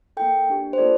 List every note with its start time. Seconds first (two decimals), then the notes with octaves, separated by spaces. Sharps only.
0.17 A#3 E4 A4 G5
0.47 A#3 D4 G4
0.73 C5
0.78 A#3 F4 A4 D5